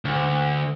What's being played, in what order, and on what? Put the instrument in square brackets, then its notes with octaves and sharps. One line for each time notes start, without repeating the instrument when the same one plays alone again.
[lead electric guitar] D2